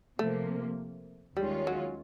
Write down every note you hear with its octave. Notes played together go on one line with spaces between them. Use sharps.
C3 F3 A3 A#3
D#2 D#3 G3 G#3 C#4 F4
F#3